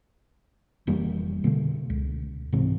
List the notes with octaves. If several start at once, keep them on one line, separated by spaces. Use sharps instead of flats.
F1 E3 G3 A#3
B2 D3 A3
C#2
G#2 C3 E3 C4